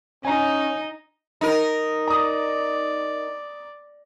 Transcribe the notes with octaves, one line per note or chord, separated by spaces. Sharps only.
C#4 D#4 G#5 A#5
D#4 A#4
D5 A#5 D#6